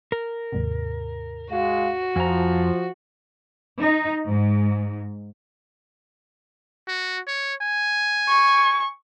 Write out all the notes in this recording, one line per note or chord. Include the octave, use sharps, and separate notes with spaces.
A#4
D#2 G#2 C3
G#3 F#4 F5
F2 F3 F5 G#5 A#5
D#4
G#2
F#4
C#5
G#5
C#6